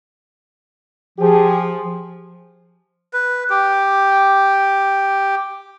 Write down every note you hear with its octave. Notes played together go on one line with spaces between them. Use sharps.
F3 G4 G#4
B4
G4